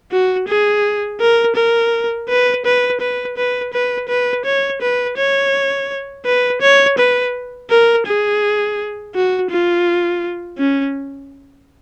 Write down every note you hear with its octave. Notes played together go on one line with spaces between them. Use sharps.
F#4
G#4
A#4
A#4
B4
B4
B4
B4
B4
B4
C#5
B4
C#5
B4
C#5
B4
A#4
G#4
F#4
F4
C#4